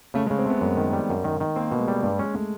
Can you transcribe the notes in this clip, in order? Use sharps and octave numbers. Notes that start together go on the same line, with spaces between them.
C#3 A3
G#3
C#3
C4
A3 B3
F#2
D#3
G3
F#2
D#3
D#3
A#3 C4
B2
G#3
G3
G2 G#3
G#3 C#4
A3